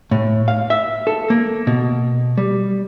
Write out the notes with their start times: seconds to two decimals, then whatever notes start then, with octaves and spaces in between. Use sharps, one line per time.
0.11 A2
0.48 F5
0.70 E5
1.07 A4
1.30 A#3
1.67 B2
2.38 G3